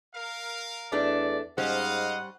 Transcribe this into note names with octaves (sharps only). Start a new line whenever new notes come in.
A#4 F5
E2 A3 D4 D5
G#2 G3 C#4 C5 D#5 F5 F#5